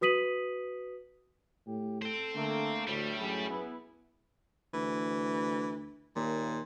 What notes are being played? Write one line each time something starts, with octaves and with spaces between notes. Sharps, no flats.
F#4 B4 D#6 B6 D#7 F#7
A2 G4
A4 C5 G5
D3 A3 A#3
D2 A2 G3
F#2 G#4
B3 E4
D2 E3
D#2 A#2